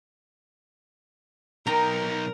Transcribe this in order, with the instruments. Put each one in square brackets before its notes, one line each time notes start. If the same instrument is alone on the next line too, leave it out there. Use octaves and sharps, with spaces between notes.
[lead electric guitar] B1 D#4 [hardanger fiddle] A#4 [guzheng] G5 A#5